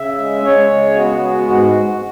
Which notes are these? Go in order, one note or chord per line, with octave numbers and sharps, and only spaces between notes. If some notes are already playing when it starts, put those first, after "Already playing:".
Already playing: C#3 E5
G#3
G#3 C#5
C#3
B3 F#4
G#3
G#2 F#4
G#2